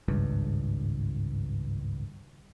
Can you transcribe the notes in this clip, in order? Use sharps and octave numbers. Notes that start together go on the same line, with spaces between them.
G#1 C#2 G2